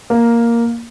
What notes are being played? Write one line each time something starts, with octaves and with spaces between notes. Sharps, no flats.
A#3